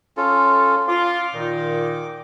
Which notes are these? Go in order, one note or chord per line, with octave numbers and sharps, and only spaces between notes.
C#4 F4 A4
F4 D6
A#2 D#3 D#4